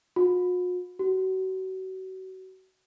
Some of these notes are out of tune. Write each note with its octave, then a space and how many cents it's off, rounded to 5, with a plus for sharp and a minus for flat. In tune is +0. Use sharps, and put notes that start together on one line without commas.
F#4 -45
F#4 +30